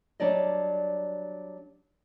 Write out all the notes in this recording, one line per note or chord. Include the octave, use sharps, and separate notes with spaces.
F#3 G3 D4 D5 D#5